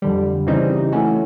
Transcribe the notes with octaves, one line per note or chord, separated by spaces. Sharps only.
F2 D3 G3
C#3 E3 G3 C4 D#4
E3 A3 C#4 F#4